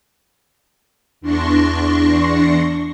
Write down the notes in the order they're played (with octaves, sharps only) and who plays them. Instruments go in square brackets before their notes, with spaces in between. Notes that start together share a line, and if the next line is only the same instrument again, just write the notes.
[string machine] E2 D4 C6 C#6 A#6